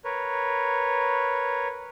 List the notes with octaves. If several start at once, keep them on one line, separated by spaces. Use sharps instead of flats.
A#4 B4 C#5